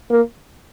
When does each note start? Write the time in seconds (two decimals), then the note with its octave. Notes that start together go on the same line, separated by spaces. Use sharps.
0.10 A#3